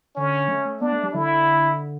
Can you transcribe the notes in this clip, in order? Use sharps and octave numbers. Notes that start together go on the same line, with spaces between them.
D3 C#4
A3
A3
B3 D4
A3
G3
D3 E4